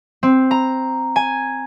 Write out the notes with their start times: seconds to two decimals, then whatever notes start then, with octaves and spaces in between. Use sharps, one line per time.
0.23 C4
0.51 A#5
1.16 G#5